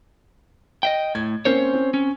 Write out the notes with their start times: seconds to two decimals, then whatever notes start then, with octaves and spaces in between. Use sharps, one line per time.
0.83 D#5 E5 G5
1.15 A2 G#6
1.45 A#3 C4 C#4 C5 C#5
1.74 C4
1.94 C#4